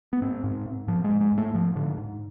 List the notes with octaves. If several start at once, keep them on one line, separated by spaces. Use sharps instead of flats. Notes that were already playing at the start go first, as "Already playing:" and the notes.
B3
G#2 C4
G#2
G#2
G#2 F3
G#3
G#2
G#3
G#2
A3
G#2 F3
G#2 D3
G#2